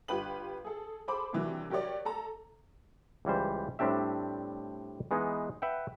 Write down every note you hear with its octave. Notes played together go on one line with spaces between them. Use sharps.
G1 F4 G4 B4 F#7
G#4 A4
G#4 A4 C5 B5 D6
G2 C3 D#3 E3 F#3
F#3 G4 A#4 C#5 D5
A4 A5 A#5
C#2 E3 G3 C5
A2 G3 C4 D4 G4 E5
E3 G#3 B3 D#4
B4 E5 F#5 G5